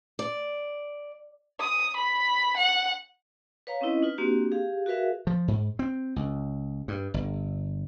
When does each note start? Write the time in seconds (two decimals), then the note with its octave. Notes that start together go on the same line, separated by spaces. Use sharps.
0.19 D5
1.60 D#6
1.96 B5
2.57 F#5
3.67 B4 C#5 F5 A#5
3.81 C4 C#4 D#4 E4 B4 D#5
4.03 D#4 F4 B4
4.18 A#3 C4 D4 F#4 G4
4.51 G4 G#4 F5
4.86 F#4 G#4 A#4 B4 E5 F5
5.27 F3
5.48 G#2
5.79 C4
6.16 C#2
6.88 G2
7.14 G1